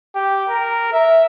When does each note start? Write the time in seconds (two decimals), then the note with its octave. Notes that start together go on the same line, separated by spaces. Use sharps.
0.15 G4
0.49 A#4
0.93 E5